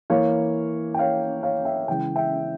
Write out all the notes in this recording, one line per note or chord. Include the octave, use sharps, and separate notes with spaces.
E3 A#3 C#5 F5
G5
C#5 F5
C#5 F5
E5 G5
C#3 E3 G#3 G5
E5 G5